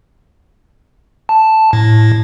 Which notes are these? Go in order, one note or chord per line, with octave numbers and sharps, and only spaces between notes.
A5
A2